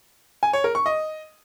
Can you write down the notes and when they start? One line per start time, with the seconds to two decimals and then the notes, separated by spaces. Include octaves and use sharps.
0.43 G#5
0.53 C#5
0.64 A#4
0.75 C#6
0.86 D#5